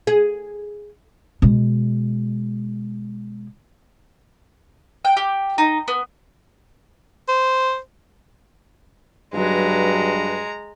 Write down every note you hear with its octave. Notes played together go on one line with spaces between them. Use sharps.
G#4
B2 G#3
G5
G4
D#4
B3
C5
G2 F#3 G#3 B4 A#5